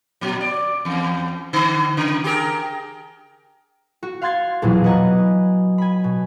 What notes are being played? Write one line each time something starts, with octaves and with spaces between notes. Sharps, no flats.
A#2 F#3
D5
E2
D3
C#3
G4 G#4 A#4
F#4
F5 F#5 C6 G#6 A6 C7
A#1 E2 B2 E3 F#3
B4 D#5 F#5 G#5 A#5
G#5 B5
B2